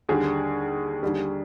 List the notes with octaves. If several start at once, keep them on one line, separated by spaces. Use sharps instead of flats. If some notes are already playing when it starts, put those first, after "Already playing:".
D#2 D3 G3 G#4
D#2 D3 G3